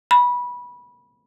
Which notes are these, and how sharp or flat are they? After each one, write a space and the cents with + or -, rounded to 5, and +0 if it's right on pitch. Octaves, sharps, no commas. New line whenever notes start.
B5 -15